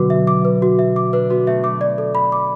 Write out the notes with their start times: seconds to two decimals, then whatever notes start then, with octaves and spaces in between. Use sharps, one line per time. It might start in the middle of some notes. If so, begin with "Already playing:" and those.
Already playing: B2 D3 F#3 F#4 B4 D6
0.10 E5
0.27 D6
0.45 B4
0.62 F#4
0.79 E5
0.96 D6
1.13 D4 B4
1.30 B3 F#4
1.47 A3 E5
1.63 A3 D6
1.81 D5
1.98 A4
2.15 B5
2.32 D6